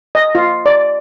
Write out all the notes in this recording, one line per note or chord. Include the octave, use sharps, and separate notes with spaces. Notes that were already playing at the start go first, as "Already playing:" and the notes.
D#5
F4
D5